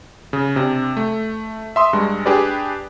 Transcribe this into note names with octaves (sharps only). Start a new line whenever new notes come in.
C#3
C3 D4
A3
E5 C6 D#6
G2 G#3
D4 G4 G#4 B4 D5